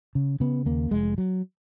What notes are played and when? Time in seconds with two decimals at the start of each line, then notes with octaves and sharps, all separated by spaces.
0.15 C#3
0.40 C#3 B3
0.66 D#2 A#3
0.91 F1 G#3
1.18 F#3